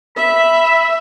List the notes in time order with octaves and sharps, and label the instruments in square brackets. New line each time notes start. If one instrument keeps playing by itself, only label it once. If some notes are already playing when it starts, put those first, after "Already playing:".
[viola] E5 [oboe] B5